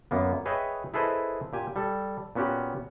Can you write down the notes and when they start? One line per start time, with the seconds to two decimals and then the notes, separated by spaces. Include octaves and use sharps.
0.11 F#2 A#3 B3
0.46 G#4 B4 C#5 D#5 E5 G5
0.94 E4 G#4 A4 B4 C5 D#5
1.53 A#2 G4 G#5
1.76 G3 A4
2.35 A#2 B3 C#4 F#4 G4